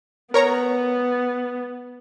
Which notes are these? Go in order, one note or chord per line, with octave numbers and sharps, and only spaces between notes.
B3 A#4 C#5 A#5